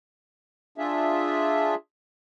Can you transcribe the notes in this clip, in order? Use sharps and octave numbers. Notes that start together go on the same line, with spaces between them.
D4 F4 G#4 E5